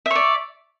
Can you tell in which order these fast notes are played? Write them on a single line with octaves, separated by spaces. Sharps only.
E5 C#5 D5